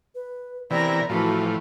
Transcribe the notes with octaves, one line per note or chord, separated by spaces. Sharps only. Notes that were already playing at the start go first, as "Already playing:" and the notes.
B4
C3 E3 B3 A#4 D5 A#6
A2 E3 F3 A3 F#4